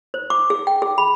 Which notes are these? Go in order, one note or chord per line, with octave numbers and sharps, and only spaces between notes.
C5
D6
G#4
G5
G#4
B5